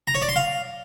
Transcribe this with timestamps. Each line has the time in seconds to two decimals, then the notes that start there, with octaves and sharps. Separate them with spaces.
0.07 A#5
0.15 C#5
0.22 D5
0.29 C6
0.36 F5